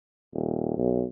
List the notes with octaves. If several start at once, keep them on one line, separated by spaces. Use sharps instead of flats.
D#1
B1